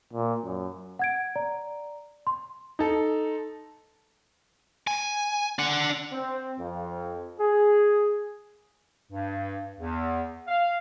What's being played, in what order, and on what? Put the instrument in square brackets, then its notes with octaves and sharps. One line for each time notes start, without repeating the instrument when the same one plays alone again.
[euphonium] A#2
F#2
[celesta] F#5 G#6 D7
D5 A#5
C6
[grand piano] D#4 A4
[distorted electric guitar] G#5
D4 F#5
[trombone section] C4
F2
G#4
[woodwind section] G2
E2
F5